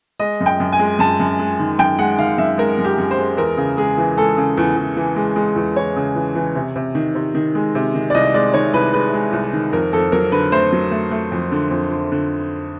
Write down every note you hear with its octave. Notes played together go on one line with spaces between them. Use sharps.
G#3 D#5
F#2
G5
F#2
G#5
G#3
F#2 A5
F#2
G#3
D#3
F#2 G5
G#3 F#5
D#3 F5
F#2 E5
G#3 A#4
F#2
G4
F#2
C5
G#3
E2 A#4
C#3
G#3 G#4
E3
G#3 A4
C#3
E2
E2
E3
G#3
G#3
E2
E2 C#5
C#3
E3
E3
C3
C3
D#3
C3
D#3
G#3
C3
D#3
D5
C2 D#5
G#3 D5
D#3 C#5
C2 B4
G#3 B4
G#3
C2
D#3
F2 A#4
F2 A4
F#3 A#4
D3 B4
A3 C5
F#3
A3
A3
F2
D3
F2
D3
D3